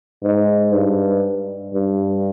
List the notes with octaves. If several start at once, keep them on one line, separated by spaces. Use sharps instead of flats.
G#2
G2
G2